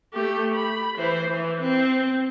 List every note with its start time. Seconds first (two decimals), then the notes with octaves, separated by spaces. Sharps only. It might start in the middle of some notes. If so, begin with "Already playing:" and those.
0.13 A3 G4
0.54 B5
0.97 E3 C5
1.30 E3
1.62 C4